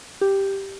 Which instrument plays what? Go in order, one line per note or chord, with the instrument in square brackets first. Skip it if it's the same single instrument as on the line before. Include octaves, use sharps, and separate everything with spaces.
[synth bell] G4